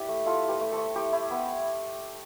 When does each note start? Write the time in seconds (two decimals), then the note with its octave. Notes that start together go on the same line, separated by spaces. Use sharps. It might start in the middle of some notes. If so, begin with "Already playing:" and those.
Already playing: E4 G4 B4 D5
0.08 A3
0.26 E4 F4 A4
0.44 E4 G4 B4
0.61 A3
0.72 A4 C5
0.78 A3
0.96 E4 G4
1.13 E4
1.30 B3